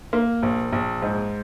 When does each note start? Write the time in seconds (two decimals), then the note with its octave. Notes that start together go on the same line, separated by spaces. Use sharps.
0.13 A#3
0.43 A#1
0.73 A#1
1.02 G#2